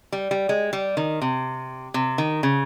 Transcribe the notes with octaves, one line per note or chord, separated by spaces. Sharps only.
G3
G3
G#3
G3
D#3
C3
C3
D#3
C#3